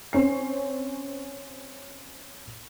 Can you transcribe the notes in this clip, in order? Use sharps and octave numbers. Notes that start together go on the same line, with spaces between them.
C4 C#4 C7